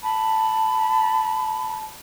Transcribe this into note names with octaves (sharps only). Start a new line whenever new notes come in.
A5 B5